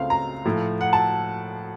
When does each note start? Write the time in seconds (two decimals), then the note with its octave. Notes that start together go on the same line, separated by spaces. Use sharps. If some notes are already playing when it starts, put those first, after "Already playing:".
Already playing: C#2 C#3 A3 C4 F5
0.10 A#5
0.45 A2 F3 A3
0.81 F#5
0.93 A5